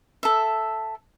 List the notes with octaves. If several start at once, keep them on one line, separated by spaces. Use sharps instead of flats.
A4 E5